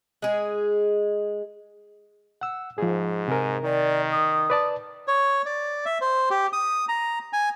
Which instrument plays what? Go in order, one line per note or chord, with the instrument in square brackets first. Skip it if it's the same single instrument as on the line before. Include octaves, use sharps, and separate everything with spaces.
[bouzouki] G#3 G#4
[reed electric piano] F#5 E6
[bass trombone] G#2 [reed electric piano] F3 G#4
[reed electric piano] C3 A#4 [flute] G#5
[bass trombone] D#3 [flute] D5
[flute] D#6
[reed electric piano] B4 D5 A5
[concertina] C#5
D5
E5
C5
G4
D#6
A#5
G#5